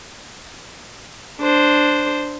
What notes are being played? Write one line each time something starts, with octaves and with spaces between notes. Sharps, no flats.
D4 C5